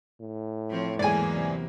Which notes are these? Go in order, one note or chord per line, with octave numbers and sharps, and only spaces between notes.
A2
F3 C4 C#5
E2 G#2 F#3 A#3 G#4 D5 G#5
C3